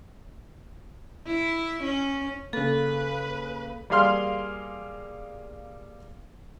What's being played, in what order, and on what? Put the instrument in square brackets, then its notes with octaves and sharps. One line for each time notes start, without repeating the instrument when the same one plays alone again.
[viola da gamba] E4
C#4
[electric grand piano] C#3 A#3 [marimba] A4 [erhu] B4
[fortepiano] G3 A#3 G#4 F5 C6 F6